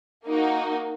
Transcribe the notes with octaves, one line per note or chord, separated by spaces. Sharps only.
A#3 D#4 F#4